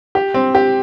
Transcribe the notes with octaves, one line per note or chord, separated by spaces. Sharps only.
G4
C4
G4